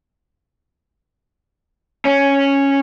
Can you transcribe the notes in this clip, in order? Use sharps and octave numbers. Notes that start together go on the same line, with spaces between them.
C#4